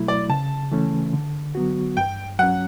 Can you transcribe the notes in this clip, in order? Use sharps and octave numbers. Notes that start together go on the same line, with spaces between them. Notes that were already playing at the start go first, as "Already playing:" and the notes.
Already playing: B2 F#3 A3 E4
D5
C#3 A5
E3 A3 C#4
D3
F#3 B3 F#4
G2 G5
F#3 C#4 F#5